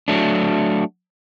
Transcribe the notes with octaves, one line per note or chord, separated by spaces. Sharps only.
F#3 A3 D4